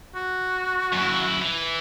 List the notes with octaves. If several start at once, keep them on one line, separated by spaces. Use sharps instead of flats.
F#4
F#2 E4
E3